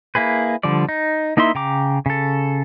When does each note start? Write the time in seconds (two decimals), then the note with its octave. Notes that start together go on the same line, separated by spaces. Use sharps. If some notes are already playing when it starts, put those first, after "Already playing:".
0.15 A#3 E4 G#4 B4
0.63 D3 F3 G3 D5
0.89 D#4
1.37 A#3 D#4 E4 E5 C6
1.55 C#3 G5 A#5 D6
2.06 C#3 A4